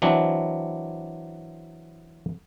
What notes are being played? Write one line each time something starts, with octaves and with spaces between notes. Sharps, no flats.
E3 F#3 C4 D4